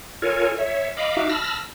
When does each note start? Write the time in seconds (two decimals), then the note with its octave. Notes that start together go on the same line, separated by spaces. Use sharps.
0.22 F4 A4 A#4 C#5 G#5
0.58 C#5 E5
0.97 D#5 F5 B5 D6
1.17 D#4 F#4 E5 F5 D6
1.29 A5 B5 E6 F6 A#6